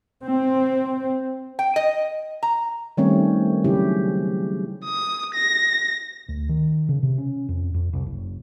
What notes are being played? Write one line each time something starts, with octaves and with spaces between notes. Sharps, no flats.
C4
G5
D#5
A#5
D#3 G3 A3 C4 C#4 C#5
C#3 F#3 C#4 E4 G4
D#6
A#6
D2
D#3
C#3
C3
C#4
F2
F2
C2
F#1